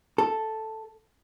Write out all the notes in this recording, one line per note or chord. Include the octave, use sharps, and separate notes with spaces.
A4